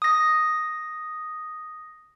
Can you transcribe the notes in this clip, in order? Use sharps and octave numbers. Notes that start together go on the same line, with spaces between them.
D#6 A#6